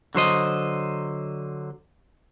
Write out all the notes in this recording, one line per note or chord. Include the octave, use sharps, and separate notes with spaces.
D3 F#3 C5 D#5